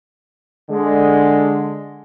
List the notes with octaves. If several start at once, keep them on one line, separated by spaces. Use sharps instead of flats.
D3 G#3